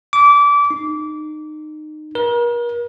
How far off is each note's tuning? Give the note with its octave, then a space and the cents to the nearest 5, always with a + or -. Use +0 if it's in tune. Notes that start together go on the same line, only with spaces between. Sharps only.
D6 -25
D#4 -25
A#4 +40